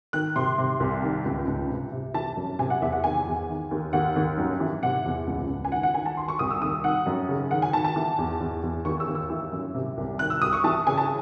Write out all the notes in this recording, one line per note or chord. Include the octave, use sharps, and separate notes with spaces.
D#3 F#6
C3 C6
C3
C2
D#3
C#2
C#2
C3
C3
E3 A5
F#2
C3 G#5
F#5
E2 E5
F#5
D#3 G#5
E2
D#3
D#2
D#2 F#5
D#2
F#2
E3
C3 F#5
E2
C#2
C#2
G#5
D#3 F#5
F#5
D#3 G#5
A5
D#3 C6
C#6
C2 D#6
E6
D#2 D#6
D#3 F#5
F#2
C#3
D#3 F#5
G#5
D#3 A5
A5
E3
E2
E2
E2
D#2 C#6
E6
D#2
E6
E3
F#2
C3
C2
D#3 F#6
E6
C2 D#6
C#6
E3 A5
C#3 G#5
A5